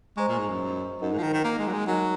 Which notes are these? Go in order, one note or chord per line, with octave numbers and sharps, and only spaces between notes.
G#3 C5 D#5 A#5 C#6
A#2
G#2
F#2
F#2 D#4 A#4 D#5 F#5
G#2
F3
D#3
D#3
A#3
G#3
F#3
G#3
F#3 D#4 A#4 D#5